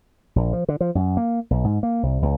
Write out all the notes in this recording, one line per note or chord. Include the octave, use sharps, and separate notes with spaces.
A#1
F3
D3
F3
F#2
A#3
B1
G#2
A#3
C2
C#2